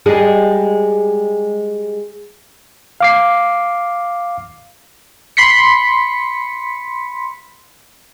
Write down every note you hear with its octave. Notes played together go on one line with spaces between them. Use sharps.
G3 G#3 G#4
F5 D6 C7
B5 C6 B6 C#7